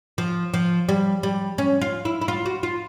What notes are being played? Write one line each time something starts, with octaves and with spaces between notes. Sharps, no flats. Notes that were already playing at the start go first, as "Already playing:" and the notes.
F3
F3
G3
G3
C#4
F4
E4
E4
F4
F#4
F4